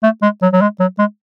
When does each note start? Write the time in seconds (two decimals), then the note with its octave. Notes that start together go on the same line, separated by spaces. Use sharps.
0.03 A3
0.22 G#3
0.42 F#3
0.53 F#3
0.61 G#3
0.80 F#3
0.99 G#3